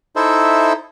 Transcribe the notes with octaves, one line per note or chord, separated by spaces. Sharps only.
D#4 E4 A4 C5 E5